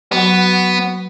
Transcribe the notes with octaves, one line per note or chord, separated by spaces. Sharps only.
F#3 B3 F#4